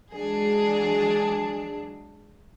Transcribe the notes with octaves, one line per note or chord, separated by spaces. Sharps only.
E3 F#3 G#3 D4 G#4